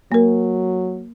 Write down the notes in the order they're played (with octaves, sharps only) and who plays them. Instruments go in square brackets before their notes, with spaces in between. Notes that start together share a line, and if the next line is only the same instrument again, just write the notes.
[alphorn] F#3 [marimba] A#3 A#4